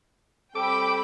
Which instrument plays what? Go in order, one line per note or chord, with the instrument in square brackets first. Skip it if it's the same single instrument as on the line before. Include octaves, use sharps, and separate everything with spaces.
[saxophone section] G3 C4 A4 [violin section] G5 B5 [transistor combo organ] D6